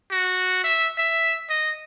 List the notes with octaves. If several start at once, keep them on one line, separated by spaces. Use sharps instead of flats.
F#4
E5
E5
D#5